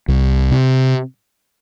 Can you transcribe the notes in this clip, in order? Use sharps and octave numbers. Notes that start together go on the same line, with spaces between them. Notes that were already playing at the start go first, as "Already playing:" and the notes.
C2
C3